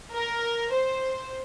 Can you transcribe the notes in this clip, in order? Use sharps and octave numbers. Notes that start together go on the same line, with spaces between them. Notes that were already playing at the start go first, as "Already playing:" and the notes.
A#4
C5